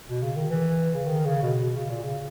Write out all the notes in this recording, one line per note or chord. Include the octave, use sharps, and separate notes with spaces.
B2
C#3
D#3
E3
C#3
D#3
C#3
B2
B2
C#3
A#2
C#3